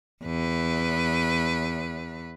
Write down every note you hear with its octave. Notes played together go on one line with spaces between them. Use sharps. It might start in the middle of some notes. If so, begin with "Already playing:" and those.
E2 B4